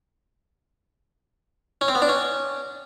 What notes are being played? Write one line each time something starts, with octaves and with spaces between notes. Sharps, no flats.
C#4
C4
B3
D4
C#4